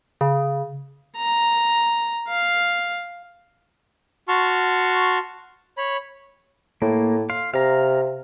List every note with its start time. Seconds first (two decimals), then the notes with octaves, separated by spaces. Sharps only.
0.21 C#3
1.17 A#5
2.28 F5
4.28 F#4 A5 C6 C#6 F6
5.78 C#5 B5
6.82 A2 A#3
7.30 F5 C6
7.54 C3 F5 A#5